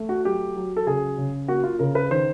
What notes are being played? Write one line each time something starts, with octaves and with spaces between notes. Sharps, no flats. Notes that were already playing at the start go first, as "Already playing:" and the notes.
Already playing: A3
F#4
F#3 G4
F#3
A4
C#3 G#4
C#3
A#3 F#4
F4
C#3 A#4
B4
D#3 C5